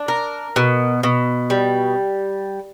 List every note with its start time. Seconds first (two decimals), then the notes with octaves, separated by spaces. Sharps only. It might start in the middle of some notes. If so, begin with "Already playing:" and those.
Already playing: D4
0.08 A#4
0.56 B2
1.03 B2
1.50 G3